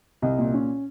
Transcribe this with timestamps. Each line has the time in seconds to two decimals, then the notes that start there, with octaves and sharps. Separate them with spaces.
0.22 C2 D#5
0.38 A#2
0.54 C#4